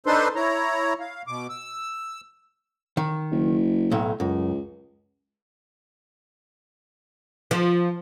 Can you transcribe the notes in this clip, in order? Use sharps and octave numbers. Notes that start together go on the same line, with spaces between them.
D4 D#4 A4 B4 C5 C6
E4 C#5 A#5
F5
B2 D6
E6
D#3
F#1
B1 A2
C#2 F#2
F3